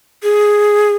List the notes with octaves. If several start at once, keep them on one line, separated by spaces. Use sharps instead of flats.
G#4